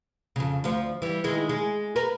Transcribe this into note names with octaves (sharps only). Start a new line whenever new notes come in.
F2 C#3
D2 F3
E3 G3
D#3 G#3 E4
G#3
A#4 B4